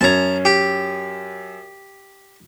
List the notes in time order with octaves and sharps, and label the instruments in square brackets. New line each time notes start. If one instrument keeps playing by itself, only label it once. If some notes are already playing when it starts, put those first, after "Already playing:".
[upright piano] F#2 C#4 G#6 [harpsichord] A5 A#5
[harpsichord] G4